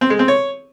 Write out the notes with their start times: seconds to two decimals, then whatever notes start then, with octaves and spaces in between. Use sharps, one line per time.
0.01 C4
0.10 G#3
0.19 C4
0.28 C#5